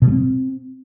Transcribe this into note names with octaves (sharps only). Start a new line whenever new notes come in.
B2
G3
C4